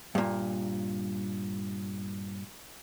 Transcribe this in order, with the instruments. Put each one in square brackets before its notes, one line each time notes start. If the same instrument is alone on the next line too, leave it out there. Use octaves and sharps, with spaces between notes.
[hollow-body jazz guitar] G2 A#2